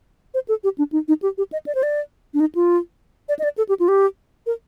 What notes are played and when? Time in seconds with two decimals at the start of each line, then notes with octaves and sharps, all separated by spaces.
0.34 C5
0.48 A4
0.64 G4
0.78 D4
0.92 D#4
1.08 D#4
1.22 G4
1.38 G4
1.53 D#5
1.66 D5
1.75 C5
1.83 D5
2.34 D4
2.40 D#4
2.55 F4
3.29 D5
3.39 D#5
3.44 D5
3.58 A4
3.69 G4
3.80 F4
3.88 G4
4.46 A#4